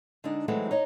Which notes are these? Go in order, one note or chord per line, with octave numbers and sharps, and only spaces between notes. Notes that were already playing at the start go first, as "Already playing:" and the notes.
D3 G#3 D4 D#4
E3 F#3 G#3 A3 C4 D#4
D#4 C#5 D#5